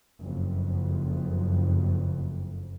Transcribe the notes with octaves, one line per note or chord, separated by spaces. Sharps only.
F#1 F2